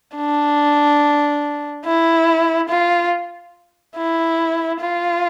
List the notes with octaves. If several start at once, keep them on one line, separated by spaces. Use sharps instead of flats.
D4
E4
F4
E4
F4